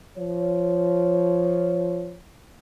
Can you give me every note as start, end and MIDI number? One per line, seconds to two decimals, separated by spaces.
0.18 2.15 53
0.18 2.15 73